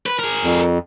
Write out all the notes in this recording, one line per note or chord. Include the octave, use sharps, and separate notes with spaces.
B4
G#4 A#4
F2